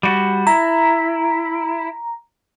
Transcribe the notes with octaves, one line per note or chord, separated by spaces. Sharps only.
G3 F#4
E4 A#5